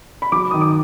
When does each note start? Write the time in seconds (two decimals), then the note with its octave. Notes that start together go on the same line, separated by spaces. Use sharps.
0.22 B5
0.32 F#3 D6
0.51 D#3 D#6
0.61 D6